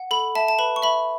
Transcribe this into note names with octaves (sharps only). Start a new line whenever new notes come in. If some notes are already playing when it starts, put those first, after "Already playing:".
Already playing: F#5
A4 B5
E5 A5
A5
B4 B5
C#6
E5 B5